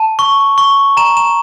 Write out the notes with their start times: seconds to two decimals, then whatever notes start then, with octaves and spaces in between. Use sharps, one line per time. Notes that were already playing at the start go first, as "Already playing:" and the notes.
Already playing: A5
0.19 C#6
0.58 C#6
0.97 A#5 E7
1.17 E7